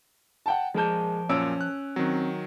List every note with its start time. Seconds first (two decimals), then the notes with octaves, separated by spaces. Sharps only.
0.46 F#5 G5 A5
0.74 F3 G#3 A#4 A5 G6
1.29 F#2 A#2 C#4 E6 D7
1.61 F#6
1.96 D#3 F#3 C4